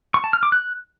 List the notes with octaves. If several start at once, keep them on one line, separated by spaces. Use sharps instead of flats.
C#6
A5
F6
D6
F#6